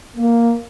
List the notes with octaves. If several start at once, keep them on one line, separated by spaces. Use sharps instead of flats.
A#3